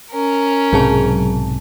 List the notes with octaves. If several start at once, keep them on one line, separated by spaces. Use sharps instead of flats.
C#4 A#4
B1 G#2 C3 F#3 G#4 A5